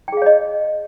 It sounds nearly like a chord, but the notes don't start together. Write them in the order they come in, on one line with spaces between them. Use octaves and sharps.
G5 G#4 F5 C#5 D#5